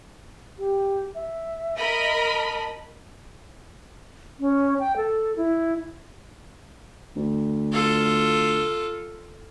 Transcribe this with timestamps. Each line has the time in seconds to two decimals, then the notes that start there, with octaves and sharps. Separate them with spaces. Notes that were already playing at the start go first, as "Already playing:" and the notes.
0.59 G4
1.14 E5
1.78 A#4 D#5 B5
2.34 A5
4.40 C#4
4.79 G5
4.97 A4
5.37 E4
7.16 D2
7.72 F4 A4